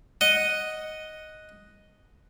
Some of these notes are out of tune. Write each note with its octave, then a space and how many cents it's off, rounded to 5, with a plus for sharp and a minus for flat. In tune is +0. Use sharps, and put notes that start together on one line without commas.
D#5 +0 F#5 +0